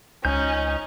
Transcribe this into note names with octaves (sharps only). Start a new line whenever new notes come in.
C#2 C#4 D#4 G6